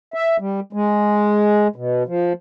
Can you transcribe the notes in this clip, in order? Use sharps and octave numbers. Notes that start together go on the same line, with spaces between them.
E5
G3
G#3
B2
F3